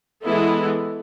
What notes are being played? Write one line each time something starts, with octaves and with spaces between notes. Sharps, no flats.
E3 G#3 B3 E4 A4